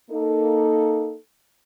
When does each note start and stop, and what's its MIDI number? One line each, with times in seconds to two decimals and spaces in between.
0.11 1.15 58
0.11 1.15 63
0.11 1.15 69